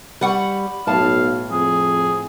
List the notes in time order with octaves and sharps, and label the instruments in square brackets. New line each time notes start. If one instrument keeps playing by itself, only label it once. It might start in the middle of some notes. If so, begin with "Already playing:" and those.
[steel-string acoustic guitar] G3 [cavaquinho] B4 F#5 C#6
[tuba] B1 [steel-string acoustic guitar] A2 A5 [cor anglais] F5
[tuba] F2 [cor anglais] G#4